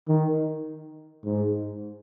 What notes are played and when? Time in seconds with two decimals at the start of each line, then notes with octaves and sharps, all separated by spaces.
0.08 D#3
1.25 G#2